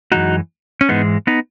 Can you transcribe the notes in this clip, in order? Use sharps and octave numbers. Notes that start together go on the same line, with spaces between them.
F#2 E3 G#3 D#4 F#4
C#4
G#2 E3 G#3 B3 D#4
B3 D#4